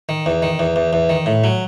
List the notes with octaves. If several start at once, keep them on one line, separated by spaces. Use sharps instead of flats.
D#3
E2
D#3
E2
E2
E2
D#3
A2
F#3